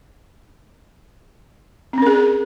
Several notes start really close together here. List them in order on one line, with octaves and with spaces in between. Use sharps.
C4 C#4 A#4 G#4